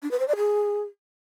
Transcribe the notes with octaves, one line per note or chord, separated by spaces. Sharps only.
D4
B4
C5
D5
G#4